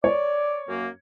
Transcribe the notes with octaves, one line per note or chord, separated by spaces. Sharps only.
C#5 D5
F#2 A#3